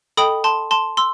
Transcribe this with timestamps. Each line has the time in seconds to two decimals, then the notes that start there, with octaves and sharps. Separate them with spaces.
0.17 A4 D#5 G5 B5 D#6
0.44 A5 C6
0.71 A5 C6
0.97 C6 E6